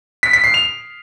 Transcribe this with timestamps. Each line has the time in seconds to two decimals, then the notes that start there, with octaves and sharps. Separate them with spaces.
0.23 B6
0.33 B6
0.44 C7
0.54 F7